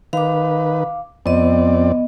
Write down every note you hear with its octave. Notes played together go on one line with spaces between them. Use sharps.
D#3 B4 F5 D6
F2 B3 C4 D5 D#5